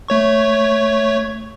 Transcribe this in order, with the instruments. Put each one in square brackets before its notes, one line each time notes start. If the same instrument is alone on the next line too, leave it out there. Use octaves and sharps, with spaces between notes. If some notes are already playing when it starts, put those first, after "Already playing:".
[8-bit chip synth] A3 C#5 C#6